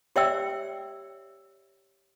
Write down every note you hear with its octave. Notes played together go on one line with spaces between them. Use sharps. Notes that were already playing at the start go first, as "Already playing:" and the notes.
G4 C#5 D5 E5 G5 E6